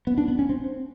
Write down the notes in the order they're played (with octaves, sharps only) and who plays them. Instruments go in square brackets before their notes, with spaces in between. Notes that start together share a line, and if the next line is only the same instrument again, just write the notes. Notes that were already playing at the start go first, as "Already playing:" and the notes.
[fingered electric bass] B3
D4
B3
C#4
C4